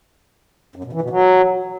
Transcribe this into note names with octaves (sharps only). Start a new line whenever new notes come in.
F#2
B2
E3
B2
F#3